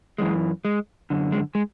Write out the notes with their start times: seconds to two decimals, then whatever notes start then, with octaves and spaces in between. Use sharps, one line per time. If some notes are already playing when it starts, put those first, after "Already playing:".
0.18 F#2 E3 G#3
0.65 G#3
1.10 F#2 D3
1.32 G#3
1.55 G#3